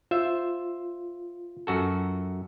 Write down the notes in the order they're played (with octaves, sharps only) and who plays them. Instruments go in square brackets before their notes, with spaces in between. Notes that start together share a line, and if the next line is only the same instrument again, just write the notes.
[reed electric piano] F4 [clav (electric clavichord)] C5 E5
[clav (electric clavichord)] F#2 F#4 A4